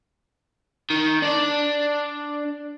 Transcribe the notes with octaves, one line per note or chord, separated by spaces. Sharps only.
D#3
D4 D5